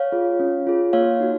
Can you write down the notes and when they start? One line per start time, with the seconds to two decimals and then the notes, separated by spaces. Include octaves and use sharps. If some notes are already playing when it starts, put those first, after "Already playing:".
Already playing: C#5 F5
0.12 F4 G#4
0.40 C#4
0.67 F4 G#4
0.93 A#3 C#5 F5
1.20 D#4 F#4